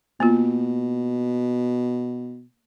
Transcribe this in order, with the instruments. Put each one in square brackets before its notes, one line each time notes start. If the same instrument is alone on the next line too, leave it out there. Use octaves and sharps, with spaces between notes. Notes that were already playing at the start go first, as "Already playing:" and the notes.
[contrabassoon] B2 [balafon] A#3 B3 F4